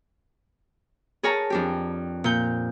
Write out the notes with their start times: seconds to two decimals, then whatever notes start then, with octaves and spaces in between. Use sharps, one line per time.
1.23 G#4 A#4 C#5 A5 A#5
1.50 F2 D4 G4
2.24 A#2 G6